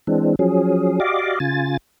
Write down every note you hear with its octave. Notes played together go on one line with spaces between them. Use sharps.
E3 G#3 C4 D4
F3 F#3 C#4 G#4
F#4 G4 D5 D#5 F5 D6
C#3 F4 G#5 A6